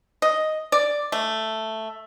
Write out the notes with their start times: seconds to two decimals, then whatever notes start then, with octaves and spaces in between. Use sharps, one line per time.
0.22 D#5
0.72 D5
1.12 A3